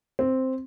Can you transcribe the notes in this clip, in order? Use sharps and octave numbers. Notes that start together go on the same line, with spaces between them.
C4